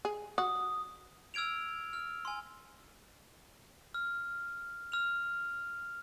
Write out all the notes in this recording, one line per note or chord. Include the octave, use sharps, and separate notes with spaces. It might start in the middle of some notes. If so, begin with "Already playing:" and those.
G#4
F#4 D#6
E6 F6 G#6 D7 F7
F6
G#5 C6
F6
F6 F7